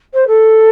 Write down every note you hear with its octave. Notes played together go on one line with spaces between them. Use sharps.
C5
A4